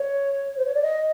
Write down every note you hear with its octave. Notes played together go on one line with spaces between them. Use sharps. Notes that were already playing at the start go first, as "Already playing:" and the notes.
Already playing: C#5
C5
C#5
D5
D#5